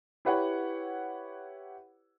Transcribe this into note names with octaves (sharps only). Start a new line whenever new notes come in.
E4 G4 B4 C#5 F#5